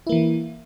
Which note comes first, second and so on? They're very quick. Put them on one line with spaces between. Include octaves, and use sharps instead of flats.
E4 A#3 E3